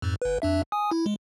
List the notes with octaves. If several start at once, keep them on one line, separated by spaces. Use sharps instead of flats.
F2 G#2
G1 B4
F2 D4 E5
G#5 D#6
E4
G#3